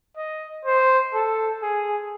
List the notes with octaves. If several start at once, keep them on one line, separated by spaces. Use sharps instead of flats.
D#5
C5
A4
G#4